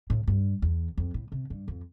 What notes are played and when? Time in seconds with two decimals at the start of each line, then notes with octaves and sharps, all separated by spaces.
0.10 A2
0.27 G2
0.62 E2
0.97 F2
1.14 A2
1.32 C3
1.50 G2
1.68 F2